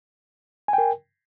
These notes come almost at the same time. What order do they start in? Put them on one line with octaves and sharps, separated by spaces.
G#5 G5 A#4